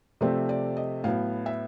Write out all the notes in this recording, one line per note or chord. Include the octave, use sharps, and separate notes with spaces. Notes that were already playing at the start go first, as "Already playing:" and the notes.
C3 F3 A3 C4 D5
D5
D#5
A2 F#3 B3 F5
E5